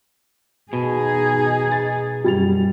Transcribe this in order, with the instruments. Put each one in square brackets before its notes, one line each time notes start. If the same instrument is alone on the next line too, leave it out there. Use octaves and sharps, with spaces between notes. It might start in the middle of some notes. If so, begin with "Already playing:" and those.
[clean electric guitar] B2 [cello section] D#4 G#4
[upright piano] A6
[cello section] F#2 [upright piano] G3 A6 F7